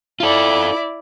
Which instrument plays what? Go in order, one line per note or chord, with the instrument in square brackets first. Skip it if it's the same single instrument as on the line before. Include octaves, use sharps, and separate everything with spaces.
[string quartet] E4 D5 [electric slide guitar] F4 A4